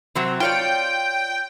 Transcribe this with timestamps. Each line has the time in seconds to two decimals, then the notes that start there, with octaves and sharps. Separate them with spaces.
0.15 C3 F#3 C4
0.40 F4 C#5 D5 G5